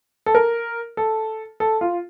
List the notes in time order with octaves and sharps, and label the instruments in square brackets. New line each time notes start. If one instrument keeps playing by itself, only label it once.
[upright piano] A4
A#4
A4
A4
F4